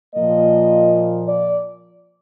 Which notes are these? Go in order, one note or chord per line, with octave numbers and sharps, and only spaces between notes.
A#2 F3 A#3 D#5
D5